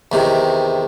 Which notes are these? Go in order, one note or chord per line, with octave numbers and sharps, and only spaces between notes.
E2 C3 D#3